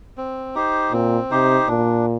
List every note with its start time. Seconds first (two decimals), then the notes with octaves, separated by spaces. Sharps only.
0.17 C4
0.55 D#4 G4 C5
0.92 A#2 C4
1.31 C3 D#4 G4 C5
1.68 A#2 D4